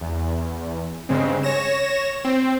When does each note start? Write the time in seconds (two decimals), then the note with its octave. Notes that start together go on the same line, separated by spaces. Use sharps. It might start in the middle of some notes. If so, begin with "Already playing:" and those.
0.01 E2
1.09 G2 C#3 G#3 C4
1.43 C#5 A#6 E7
2.25 C4